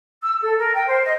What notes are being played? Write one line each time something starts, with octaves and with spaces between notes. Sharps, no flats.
E6
A4
A#4
G5
C5
D#5